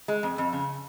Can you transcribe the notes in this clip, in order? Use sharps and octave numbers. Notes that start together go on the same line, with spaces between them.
G#3
F2
F2
C#3